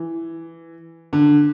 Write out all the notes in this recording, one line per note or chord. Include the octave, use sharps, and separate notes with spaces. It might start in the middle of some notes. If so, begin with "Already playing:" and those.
Already playing: E3
D3